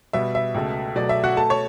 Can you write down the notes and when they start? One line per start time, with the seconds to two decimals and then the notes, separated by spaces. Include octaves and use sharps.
0.13 B2 G3 B3 E5
0.35 E5
0.54 C#2 B2 A3
0.96 B2 F#3 A3 D5
1.09 E5
1.24 F#4 F#5
1.37 B2 A3 A4 A5
1.50 C#5 C#6